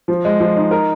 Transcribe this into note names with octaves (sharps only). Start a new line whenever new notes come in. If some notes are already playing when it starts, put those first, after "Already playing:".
F3
G#3
F3
D#4
A#4